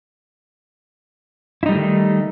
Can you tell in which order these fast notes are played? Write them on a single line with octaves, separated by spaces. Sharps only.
E4 D#4 G3 A3 D#3